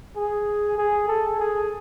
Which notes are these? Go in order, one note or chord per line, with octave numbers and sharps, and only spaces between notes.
G#4
G#4
A4
G#4